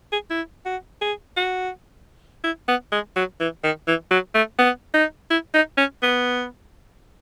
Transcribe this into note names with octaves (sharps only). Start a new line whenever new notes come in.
G#4
E4
F#4
G#4
F#4
E4
B3
G#3
F#3
E3
D#3
E3
F#3
A3
B3
D#4
E4
D#4
C#4
B3